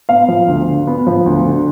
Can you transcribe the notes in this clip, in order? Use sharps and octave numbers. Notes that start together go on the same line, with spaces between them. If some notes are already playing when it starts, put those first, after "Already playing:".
B3 F5
F3
D2
D3
B3
F3
D2
D3